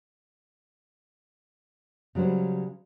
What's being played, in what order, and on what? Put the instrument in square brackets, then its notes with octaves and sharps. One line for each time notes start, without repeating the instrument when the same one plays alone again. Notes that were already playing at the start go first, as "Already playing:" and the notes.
[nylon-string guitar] C#3 F#3 G3 C5